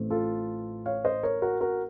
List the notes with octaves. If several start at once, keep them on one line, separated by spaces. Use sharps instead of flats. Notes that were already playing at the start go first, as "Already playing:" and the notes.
Already playing: A1 A2 A3 C4
F4 A4
C#5 F5
C5 D#5
A#4 C#5
F#4 A#4
F#4 A#4